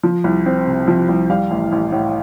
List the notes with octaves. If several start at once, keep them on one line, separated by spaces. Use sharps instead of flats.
F3
C2
C4
C3
F3
C2
G3 F5
A1
A1
A2